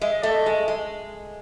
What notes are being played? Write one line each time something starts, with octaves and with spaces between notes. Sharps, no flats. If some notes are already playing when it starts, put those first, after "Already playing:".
G#3 E5
D#5
A3 D5
D#5
G#3
G#3